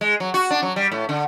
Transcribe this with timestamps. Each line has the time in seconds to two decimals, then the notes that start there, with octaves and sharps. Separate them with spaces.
0.01 G#3
0.20 F#3
0.34 F#4
0.51 D4
0.63 F#3
0.76 G3
0.92 A2
1.09 D3